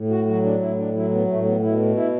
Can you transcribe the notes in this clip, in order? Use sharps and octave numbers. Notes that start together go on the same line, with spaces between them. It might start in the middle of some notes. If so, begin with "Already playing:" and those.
Already playing: A2
F#4
F#3 F#4
D4
A2 E4
D4
F#3 E4
B3
A2 A3
B3
B2 E4
E4